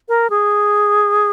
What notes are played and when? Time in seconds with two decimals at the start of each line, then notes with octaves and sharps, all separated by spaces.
0.09 A#4
0.30 G#4